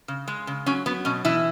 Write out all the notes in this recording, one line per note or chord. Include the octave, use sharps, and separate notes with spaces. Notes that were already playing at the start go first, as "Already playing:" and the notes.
C#3
G#3
C#3
F#3 C#4
F#3 B3
B2 C#4
B2 E3 E4